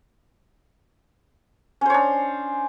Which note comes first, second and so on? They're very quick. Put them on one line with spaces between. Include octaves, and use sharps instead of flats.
C#4 C5 C#5 D4